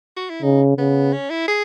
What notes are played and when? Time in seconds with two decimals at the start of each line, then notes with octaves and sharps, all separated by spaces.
0.16 F#4
0.30 E4
0.43 C#3 D#4
0.77 C#3 B3
1.13 C#4
1.30 E4
1.48 G#4